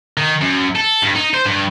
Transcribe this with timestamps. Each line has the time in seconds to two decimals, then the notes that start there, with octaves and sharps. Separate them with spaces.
0.17 D#3
0.41 F#2
0.75 A4
1.02 G2
1.15 D#4
1.34 C5
1.45 G2